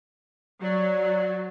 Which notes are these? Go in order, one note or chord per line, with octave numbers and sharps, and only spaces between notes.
F#3 D5